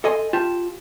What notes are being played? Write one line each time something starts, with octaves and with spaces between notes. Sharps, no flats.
A4 D#5 G#5 C6
F4 G4 A5